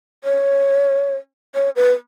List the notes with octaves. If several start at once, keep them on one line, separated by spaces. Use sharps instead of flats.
C#5
C#5
B4